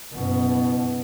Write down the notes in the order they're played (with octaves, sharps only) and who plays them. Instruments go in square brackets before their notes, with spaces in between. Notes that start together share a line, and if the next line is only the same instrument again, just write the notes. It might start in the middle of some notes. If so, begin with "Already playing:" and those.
[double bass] F#1 B2